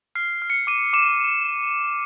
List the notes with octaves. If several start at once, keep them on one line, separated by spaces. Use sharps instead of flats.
F6 C7
F6
C#7
D6 D#7
D6 E7